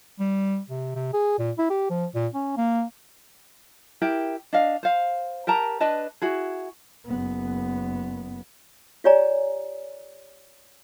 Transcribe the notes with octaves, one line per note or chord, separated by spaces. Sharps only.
G3
C3
C3
G#4
A#2
E4
G4
F3
A#2
C#4
A#3
E4 G4 A#4 G5
D4 D#5 F5
C5 F5
G4 A#4 A5 A#5
D4 B4 D#5 A5
E4 F#4 G#4
F#1 B3
F4 G4 C#5 D5 G#5 A#5